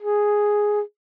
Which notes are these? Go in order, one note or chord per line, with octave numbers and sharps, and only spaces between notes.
G#4